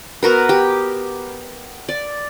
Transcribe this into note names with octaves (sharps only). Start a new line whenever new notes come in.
B3 F#4 A#4 B4
G4
D5